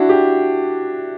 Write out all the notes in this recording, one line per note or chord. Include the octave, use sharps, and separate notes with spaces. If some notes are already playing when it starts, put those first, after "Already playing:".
Already playing: D4 E4 F#4
G4